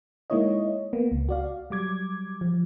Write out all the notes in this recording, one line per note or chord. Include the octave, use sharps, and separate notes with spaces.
G#3 A#3 D#4 E4 C#5 D#5
A#3 B3
C#2
F#4 D5 F5
F#3 G3 D6 G#6
F3